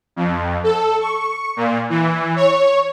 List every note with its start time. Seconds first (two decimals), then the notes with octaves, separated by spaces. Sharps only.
0.16 F2
0.64 A4
1.00 C#6
1.57 A#2
1.90 E3
2.36 C#5